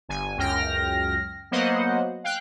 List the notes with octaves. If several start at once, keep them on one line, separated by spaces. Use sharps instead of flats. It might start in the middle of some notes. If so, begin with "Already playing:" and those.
G1 G#5
C#2 F#2 G5 F6 A#6
F#3 A#3 B3 C5 D#5 F#5
F5 G5 F#6